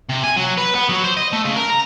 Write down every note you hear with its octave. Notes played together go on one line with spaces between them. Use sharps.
C3
G#5
F#3
B4
B3
F#3
C5
D#5
A3
C#3
A#4
A#5